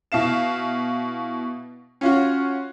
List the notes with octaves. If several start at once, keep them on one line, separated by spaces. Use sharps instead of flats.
B2 E4 F5 E7
C#4 F4 F#4